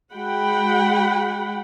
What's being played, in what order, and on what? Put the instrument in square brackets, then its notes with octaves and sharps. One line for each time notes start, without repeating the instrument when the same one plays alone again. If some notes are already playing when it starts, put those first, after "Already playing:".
[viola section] G#3 F#4 F#5 G5 B5